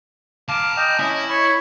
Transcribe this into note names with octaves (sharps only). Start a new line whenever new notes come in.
F5 G#5 A5 D6
D#5 G5
C#4 E4 D#5
C#5 B5